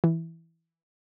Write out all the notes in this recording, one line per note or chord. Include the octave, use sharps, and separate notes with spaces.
E3